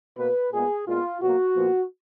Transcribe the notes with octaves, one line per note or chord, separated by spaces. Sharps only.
B2 A#3 B4
A#2 G#3 B3 G#4
A#2 G#3 B3 F4
B2 F#3 A#3 F#4
A#2 F3 B3